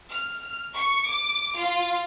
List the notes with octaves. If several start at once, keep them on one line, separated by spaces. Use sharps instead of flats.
F6
C#6
D6
F4